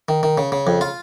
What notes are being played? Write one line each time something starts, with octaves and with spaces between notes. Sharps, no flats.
D#3
D#3
C#3
C#3
F2
F4